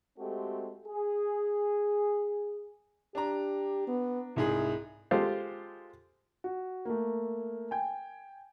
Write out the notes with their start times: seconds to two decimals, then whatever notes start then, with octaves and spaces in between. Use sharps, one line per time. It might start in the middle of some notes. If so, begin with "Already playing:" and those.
0.19 G#3 A3 C4 F#4 G4 A4
0.87 G#4
3.15 D4 G4 A#5
3.88 B3
4.36 C2 G#2 E4 G#4
5.11 G#3 F4 G4 A4 C5
6.44 F#4
6.85 A3 A#3
7.71 G5 G#5